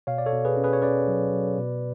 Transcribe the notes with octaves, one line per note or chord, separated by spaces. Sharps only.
B2 C#5 F5
D5
A4 C#5
B2
G#4 B4
C#4
G#4 B4
C#5
C#4 B4 D5
F#3
F#3
B2